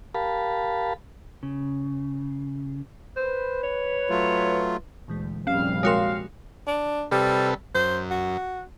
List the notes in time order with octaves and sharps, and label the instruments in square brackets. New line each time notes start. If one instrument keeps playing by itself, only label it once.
[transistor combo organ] G4 A#4 F5 A5 B5
[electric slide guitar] C#3
[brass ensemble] B4 [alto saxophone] C5
[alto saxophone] C#5
[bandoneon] F#3 A3 F4
[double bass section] D2 [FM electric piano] A#2 E3 G#3
[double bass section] F1 A#1 G3 [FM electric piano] C#4 [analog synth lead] F5
[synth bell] G#3 F#4 A#4 [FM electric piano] C#5 G5 C6
[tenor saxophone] D4
[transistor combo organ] C3 A4 B4 [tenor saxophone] G3
[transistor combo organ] F#2 [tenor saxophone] C5
[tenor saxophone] F#4